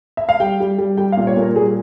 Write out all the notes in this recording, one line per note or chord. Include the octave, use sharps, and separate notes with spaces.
E5
F5
G3 G5
G3
G3
G3 G5
F5
A#2
C#5
A#2 A#4
G3 G#4